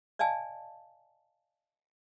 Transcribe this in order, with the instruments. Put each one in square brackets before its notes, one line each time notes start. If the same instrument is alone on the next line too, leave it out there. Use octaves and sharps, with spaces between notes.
[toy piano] D5 D#5 F5 G#5 A5